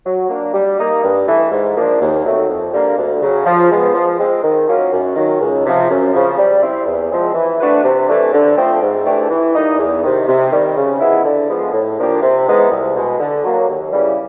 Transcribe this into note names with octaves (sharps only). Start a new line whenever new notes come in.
F#3
A#3 D4
G3
A#3 D#4
G2
E3 A3
G#2
F3 A#3 D4
D#2
D#3 F#3 A3 C4
F2
D3 G3 A#3
D2
C#3 F#3
F3
G#3 B3
F3
G#3 C4
D#3
F#3 A#3 C#4 F4
F#2
D#3 F#3
C#2
C3 F3
F#2
C#3 F3
G3
C4 E4
E2
C3 F3 G#3 C4
E3
A3 D4 F#4 B4
C3
E3 A3 D4
D3
F3 A3 C4
G#2
E3 A3 D4 G4
E3
G3 A#3 D#4
E2
C3 D#3
C3
D#3 G3
C#3
F3 G#3 B3 E4
D3
F3 G#3 B3
A2
F3 A#3 D4 G4
C3
E3 G#3 B3 D#4
C2
B2 G#3
D3
F#3 A#3
D#2
C#3 E3 G3